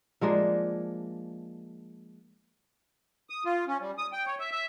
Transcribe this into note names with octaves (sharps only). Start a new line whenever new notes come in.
F3 G#3 A#3 D4
D#6
F4
C#4
G3
D#6
G5
C#5
E5
E5